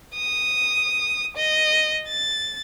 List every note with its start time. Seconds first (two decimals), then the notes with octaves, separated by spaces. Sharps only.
0.14 D#6
1.36 D#5
2.08 A6